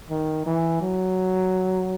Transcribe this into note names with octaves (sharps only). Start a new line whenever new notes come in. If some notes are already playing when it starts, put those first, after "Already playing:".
D#3
E3
F#3